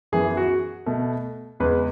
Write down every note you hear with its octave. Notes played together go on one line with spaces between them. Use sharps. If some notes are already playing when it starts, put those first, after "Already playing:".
F#2 E3 B3 G#4
F#4
B2 A3
E2 C#3 G#3 B3 B4